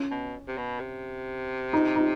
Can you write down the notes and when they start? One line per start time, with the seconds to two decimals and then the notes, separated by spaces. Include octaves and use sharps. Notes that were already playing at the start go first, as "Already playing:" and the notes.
Already playing: C#4
0.11 B2
0.48 C3
0.57 B2
0.80 C3
1.73 D#4
1.96 D#4